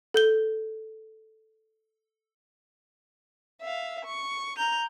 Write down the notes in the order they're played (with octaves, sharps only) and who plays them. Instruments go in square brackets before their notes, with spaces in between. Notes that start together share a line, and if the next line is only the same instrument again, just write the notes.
[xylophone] A4 G6 G7
[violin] E5 F5
C#6
[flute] A#5 [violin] G6 F7